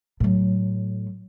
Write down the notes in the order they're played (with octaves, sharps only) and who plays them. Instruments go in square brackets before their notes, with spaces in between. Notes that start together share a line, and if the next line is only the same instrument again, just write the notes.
[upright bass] A2 F#3